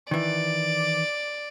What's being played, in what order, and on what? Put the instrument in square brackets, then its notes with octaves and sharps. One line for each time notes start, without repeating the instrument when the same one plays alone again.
[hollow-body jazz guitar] D#3 E3 [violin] D5